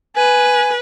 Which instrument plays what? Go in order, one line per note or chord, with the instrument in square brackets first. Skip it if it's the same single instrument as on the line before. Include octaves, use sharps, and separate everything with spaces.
[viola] B4 [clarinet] G#5